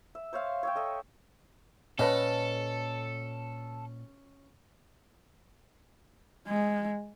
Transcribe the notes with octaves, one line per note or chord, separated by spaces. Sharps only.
E5
C5 C#5 E5 F5
C#5 E5 G5
A4 D#5 E5
A#2 C#4 A4 B4 D#5 F#5 A5
G#3